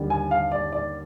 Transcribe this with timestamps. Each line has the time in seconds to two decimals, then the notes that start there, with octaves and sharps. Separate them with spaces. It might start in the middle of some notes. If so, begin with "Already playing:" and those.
Already playing: D#2 D3 G3
0.10 G#5
0.31 F5
0.51 D5
0.72 D5